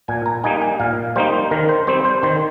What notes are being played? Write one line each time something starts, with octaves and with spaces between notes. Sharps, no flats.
A#2 G#5
A#5
G3 A#3 D#4 G#5
G#5
A#2 F5
G3 A#3 D#4 C5
D#3 A#4
C5
G3 C4 C5
C5
D#3 C5